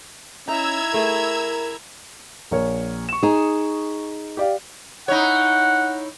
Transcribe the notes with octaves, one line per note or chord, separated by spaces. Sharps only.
C#4 D#4 E4 E5 A#5 E6 G#6
A3 G#4 A#4 E5
A#1 A#4 C#5
C#6 E7
D#4 G#4
G4 D5 F5
D#4 E4 C#5 F#5